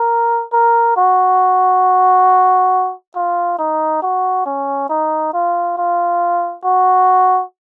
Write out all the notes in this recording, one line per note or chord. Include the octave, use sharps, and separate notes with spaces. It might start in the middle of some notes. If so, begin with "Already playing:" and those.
Already playing: A#4
A#4
F#4
F4
D#4
F#4
C#4
D#4
F4
F4
F#4